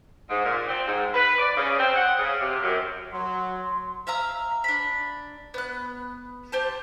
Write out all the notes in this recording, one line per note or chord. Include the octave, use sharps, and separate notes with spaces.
G#2
A#2
C4
G#2
B4
D5
C#3
C4
F#5
C#3
C3
F#2
F#3 C6
E5 F5 A#5 E6
D4 B5
B3 F#6
G4 C5 A5